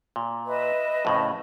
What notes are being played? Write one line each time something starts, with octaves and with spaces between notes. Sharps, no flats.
A#2
B4 D#5 E5
F2 A2 C#3